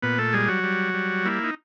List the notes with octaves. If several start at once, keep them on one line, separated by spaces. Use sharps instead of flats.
A#2 B3 B4
A3 A4
G3 G#3 G#4
F#3 F#4
G3
G3
A#3 E4
D#4